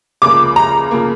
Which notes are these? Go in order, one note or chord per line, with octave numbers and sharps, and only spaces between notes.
C#2 C#3 F3 A#3 D6
A#5
C#3 F3 A#3